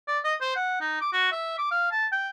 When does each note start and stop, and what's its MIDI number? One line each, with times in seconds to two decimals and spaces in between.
0.07 0.19 74
0.24 0.35 75
0.41 0.52 72
0.56 0.78 78
0.81 0.98 63
1.01 1.08 86
1.13 1.32 66
1.32 1.53 76
1.58 1.67 86
1.71 1.88 77
1.92 2.06 81
2.12 2.29 79